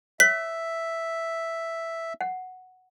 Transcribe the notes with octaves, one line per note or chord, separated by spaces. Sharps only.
C#5 E5 B6
F#5